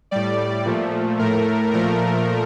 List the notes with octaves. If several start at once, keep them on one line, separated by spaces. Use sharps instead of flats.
A2 G3 D5
A#2 F3 A3
A2 A3 A#4
A#2 F3 A3 A#4